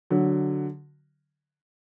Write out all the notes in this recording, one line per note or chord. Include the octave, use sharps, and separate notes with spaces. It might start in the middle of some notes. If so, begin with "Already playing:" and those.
D3 F#3